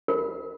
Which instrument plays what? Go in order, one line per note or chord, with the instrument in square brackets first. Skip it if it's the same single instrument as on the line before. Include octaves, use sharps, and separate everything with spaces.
[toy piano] A#4